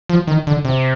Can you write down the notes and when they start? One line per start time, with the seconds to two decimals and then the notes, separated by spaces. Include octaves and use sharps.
0.09 F3
0.27 D#3
0.47 D3
0.65 C3